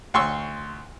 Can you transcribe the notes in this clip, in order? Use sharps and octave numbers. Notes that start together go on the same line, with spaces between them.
D2 C6 C#6 E6